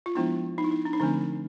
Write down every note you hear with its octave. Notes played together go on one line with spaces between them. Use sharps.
F4
F3 G#3 B3 D4 E4
D#4
E4
D#4
D4
D#4
D3 F3 A3 C4 D4